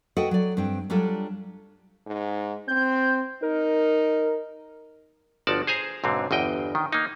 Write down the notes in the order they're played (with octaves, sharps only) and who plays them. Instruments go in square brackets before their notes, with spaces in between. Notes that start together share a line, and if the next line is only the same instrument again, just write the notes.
[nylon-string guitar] F#4 A4 B4 D#5 F#5 G5
F#3 D5
G2 C4 G5
F#3 G3 D4 F4 A4
[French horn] G#2
[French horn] C4 [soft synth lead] G6
[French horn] D#4 [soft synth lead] A#4
[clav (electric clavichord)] G1 F3 F#4 D5 A5
G#4 C5 G#5 A#5
B1 G#2 D3 C4
G1 E2 D#5 G5
D#3
A#3 D#4